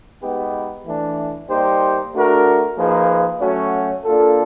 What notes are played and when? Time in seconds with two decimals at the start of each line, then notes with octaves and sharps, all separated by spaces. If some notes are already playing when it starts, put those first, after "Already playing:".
0.21 G#3 B3 D#4 G4 B4
0.85 E3 A3 D4
1.49 G3 A#3 D#4 G4 C5
2.13 A3 D4 F#4 A#4
2.76 F3 A#3 D#4 G#4 B4
3.40 F#3 A3 C#4 F#4
4.04 A#3 D4 F4 A4